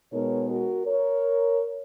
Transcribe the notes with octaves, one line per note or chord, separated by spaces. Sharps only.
B2 G#3 B3 D#4 A#4 C#5
F#4 A#4
A#4 C#5